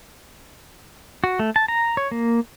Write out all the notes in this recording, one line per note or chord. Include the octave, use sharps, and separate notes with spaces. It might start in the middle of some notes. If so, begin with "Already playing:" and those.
F#4
A3
A5
A#5
C#5
A#3